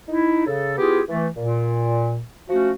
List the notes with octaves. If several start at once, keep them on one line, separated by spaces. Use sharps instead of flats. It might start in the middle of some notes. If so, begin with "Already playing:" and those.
D#4 E4
C#3 A4
B3 E4 F4 G4 G#4
E3 A3
A#2
F3 A3 C#4 F#4